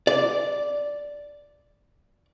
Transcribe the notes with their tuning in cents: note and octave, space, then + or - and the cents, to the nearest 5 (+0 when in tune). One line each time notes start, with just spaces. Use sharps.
D5 -5